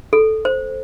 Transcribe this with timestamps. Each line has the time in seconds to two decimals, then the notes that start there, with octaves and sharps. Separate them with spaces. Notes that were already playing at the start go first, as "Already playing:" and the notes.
0.13 A4
0.45 C5